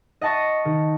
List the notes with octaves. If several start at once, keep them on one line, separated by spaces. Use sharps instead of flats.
D#5 F#5 A5 C#6 A#6
D#3